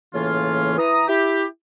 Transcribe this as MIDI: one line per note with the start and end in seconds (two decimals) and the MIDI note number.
0.14 0.75 45
0.14 0.75 49
0.14 0.75 52
0.14 0.75 58
0.14 0.75 61
0.14 0.75 65
0.78 1.07 52
0.78 1.07 82
0.78 1.07 87
1.08 1.45 64
1.08 1.45 67